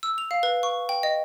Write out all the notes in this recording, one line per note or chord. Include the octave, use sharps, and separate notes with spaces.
E6
F7
F5
B4
C#6
G5
D#5